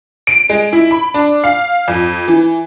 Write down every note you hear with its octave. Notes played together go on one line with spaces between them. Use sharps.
D7
G#3
E4
B5
D4
F5
F2
E3